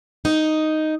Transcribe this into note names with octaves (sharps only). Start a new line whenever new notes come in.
D#4